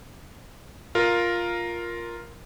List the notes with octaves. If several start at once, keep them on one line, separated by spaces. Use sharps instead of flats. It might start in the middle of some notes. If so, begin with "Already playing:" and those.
F4 A#4